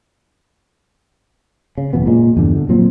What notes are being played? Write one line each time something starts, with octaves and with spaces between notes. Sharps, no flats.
C#3
F#1 E2 B2 B3
A#2 G#3
E2 G2 D3
D3
A#2 F#3 C4